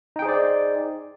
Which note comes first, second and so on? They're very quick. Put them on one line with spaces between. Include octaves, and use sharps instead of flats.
D#4 G5 G#4 C5 D5